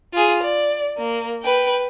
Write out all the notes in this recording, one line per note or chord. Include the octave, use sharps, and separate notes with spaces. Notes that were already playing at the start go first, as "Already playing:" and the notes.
F4 G#4
D5
A#3
B4 G5